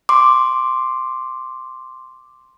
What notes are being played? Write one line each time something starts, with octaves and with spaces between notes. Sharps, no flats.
C6 D6